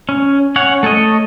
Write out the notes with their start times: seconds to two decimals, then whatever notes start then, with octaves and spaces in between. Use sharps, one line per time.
0.09 C#4
0.56 C#4 C#5 F#5
0.83 A3 A4 C#5 D#5